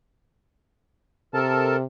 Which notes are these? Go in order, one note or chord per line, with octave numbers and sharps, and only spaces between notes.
C3 A4 A#4 A5